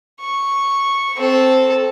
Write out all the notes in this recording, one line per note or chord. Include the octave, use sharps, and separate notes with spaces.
C#6
C4 A4